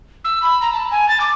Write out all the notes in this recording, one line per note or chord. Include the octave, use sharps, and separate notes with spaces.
E6
B5
A#5
A5
G#5
A6
D6